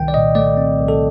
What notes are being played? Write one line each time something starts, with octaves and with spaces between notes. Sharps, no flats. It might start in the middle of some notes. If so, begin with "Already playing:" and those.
Already playing: C2 D#3 G5
D5
A#2 D#5
A3 D5
C4
C2
A4